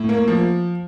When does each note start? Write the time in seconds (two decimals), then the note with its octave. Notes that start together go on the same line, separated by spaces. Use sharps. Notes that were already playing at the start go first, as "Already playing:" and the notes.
Already playing: A2
0.09 A#3
0.28 F3